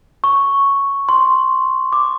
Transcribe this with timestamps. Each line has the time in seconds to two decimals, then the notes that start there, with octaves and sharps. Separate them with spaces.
0.24 C#6
1.09 C6
1.93 D6